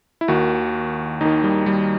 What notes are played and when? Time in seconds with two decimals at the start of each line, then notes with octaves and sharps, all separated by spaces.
0.21 E4
0.28 D#2 D#3 F#4
1.21 D#2 D#3 D#4
1.43 G3
1.66 G3